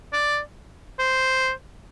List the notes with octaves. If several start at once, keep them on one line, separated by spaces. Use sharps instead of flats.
D5
C5